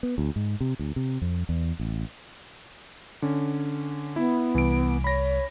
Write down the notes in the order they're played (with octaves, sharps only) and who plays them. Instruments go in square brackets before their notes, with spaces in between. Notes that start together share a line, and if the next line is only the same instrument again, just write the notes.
[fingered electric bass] B3
D2
G#2
C3
D2
C3
F2
E2
A1
[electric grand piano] D3 C#4
[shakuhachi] B3 [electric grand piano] E4
[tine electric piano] C2 [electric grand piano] E3 D7
[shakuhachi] C#5 [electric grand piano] B5 A#6